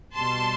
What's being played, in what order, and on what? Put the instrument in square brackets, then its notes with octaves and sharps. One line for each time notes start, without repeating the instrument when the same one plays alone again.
[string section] B2 G3 A5 C6